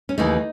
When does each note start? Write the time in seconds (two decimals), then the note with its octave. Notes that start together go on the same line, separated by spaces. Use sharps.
0.09 C#4
0.18 D#2 C#3 E3 A3 D#4